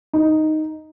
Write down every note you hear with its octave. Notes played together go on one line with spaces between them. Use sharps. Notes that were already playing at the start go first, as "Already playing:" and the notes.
D#4